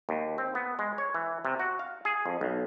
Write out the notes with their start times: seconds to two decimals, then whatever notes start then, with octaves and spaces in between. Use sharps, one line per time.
0.09 D#2
0.38 C4
0.55 B3
0.79 G#3
0.98 C#5
1.14 E3
1.45 C3
1.59 F#4
1.79 F5
2.05 G#4
2.26 F2
2.41 B1